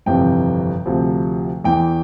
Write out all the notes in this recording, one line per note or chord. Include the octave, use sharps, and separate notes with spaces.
G1 F2 C3 E3 G5
D2 C3 F3
E2 E3 G5